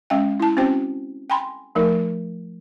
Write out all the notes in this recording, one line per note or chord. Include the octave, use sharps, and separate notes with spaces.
G#3 C#4 F5 G5
E4 A5
C4 C#4 F#4 C5 G5
G5 G#5 B5 C6
F3 A3 D#4 A#4